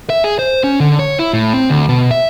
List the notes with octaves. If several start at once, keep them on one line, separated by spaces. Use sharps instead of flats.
E5
G#4
C5
C#4
D3
C#5
E4
A2
C4
D2
B2
E5